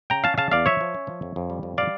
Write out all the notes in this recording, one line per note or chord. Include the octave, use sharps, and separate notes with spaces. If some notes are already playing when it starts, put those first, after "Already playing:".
C#3 G5 A#5
C#4 F5 A5
C#3 F5 A5
E2 D5 F5
F3 C#5 E5
F3
C#4
F3
F2
F2
G3
F2
G3 D5 F5